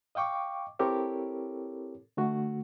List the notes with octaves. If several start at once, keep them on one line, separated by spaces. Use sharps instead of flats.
D#5 F5 G5 C#6 D6
C4 E4 G4 A4 A#4 C#5
D3 A3 F#4